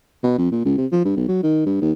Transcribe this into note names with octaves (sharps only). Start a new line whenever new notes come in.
B2
F2
A#2
C#2
C3
F3
G2
B1
F#3
D#3
G2
D#2